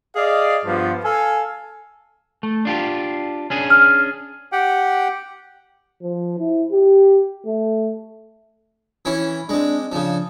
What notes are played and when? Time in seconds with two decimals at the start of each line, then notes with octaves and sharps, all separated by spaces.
0.15 G#4 D5 D#5 F5
0.64 G2 F3 B3 F4
1.03 A4 F5 G#5
2.43 A3
2.65 D4 F4 G4
3.50 C#4 D4 G#4
3.70 F6
4.52 G4 F#5 G5
6.02 F3
6.39 E4
6.72 G4
7.46 A3
9.05 E3 C#4 E4
9.49 G#3 C4 D4
9.92 C#3 F3 D4